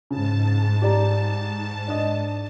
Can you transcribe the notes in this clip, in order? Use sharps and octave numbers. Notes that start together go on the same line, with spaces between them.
G#2 C#3 A5
G4 D5 A#5
D4 D#5